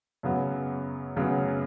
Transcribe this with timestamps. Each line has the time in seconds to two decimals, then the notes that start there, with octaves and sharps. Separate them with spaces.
0.23 F#2 C#3 F#3 B3
1.16 F#2 C#3 F#3 B3